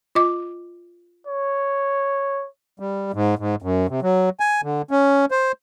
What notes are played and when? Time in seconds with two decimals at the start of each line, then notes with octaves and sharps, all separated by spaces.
0.15 F4 D#5 D6
1.27 C#5
2.79 G3
3.14 G#2
3.39 G#2
3.62 F#2
3.89 C3
4.02 F#3
4.40 G#5
4.63 D3
4.91 C#4
5.31 C5